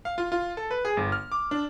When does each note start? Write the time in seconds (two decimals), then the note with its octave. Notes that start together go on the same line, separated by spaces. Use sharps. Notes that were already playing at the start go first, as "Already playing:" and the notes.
0.05 F5
0.18 F4
0.32 F4
0.57 A4
0.71 B4
0.85 G#4
0.97 G1
1.12 F6
1.32 D6
1.51 D4